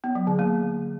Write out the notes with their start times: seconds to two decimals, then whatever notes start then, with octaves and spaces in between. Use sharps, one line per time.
0.04 B3
0.15 F#3
0.27 D3
0.39 A#3